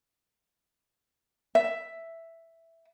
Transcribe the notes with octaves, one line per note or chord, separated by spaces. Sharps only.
E5